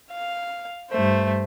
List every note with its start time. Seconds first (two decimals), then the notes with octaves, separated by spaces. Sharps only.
0.12 F5
0.90 G2 A3 C5